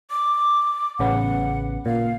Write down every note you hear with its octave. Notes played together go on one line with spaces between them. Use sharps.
D6
A1 C#3 B3 F#5
A#2 F5